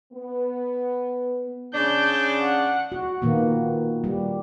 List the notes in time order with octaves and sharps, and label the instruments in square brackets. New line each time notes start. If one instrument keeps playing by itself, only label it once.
[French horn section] B3
[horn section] C#3 D4 [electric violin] G6
[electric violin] F#5
[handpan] F#4
A#2 D#3 A#3 B3
G3